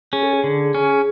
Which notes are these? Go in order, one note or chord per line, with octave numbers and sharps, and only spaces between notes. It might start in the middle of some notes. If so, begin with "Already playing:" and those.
C#4 G#4
A4
G#4
D3
C#4